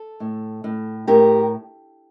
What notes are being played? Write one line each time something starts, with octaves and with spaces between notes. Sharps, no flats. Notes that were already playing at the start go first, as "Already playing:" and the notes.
Already playing: A4
A2
A2
A2 G4 A#4